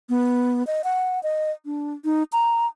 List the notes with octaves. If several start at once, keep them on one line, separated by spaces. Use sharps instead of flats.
B3
D#5
F#5
D#5
D4
D#4
A#5